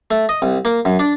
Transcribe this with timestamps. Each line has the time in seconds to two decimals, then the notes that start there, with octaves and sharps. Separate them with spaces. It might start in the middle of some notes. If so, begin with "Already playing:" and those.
0.11 A3
0.29 D#5
0.42 C2
0.65 A#3
0.85 F#2
0.99 D4